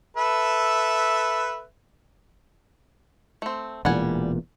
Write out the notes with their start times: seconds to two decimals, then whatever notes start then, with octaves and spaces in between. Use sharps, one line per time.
0.17 A4 B4 E5
3.42 A3 C4
3.85 E1 E2 A#2 G3 F#5 G#5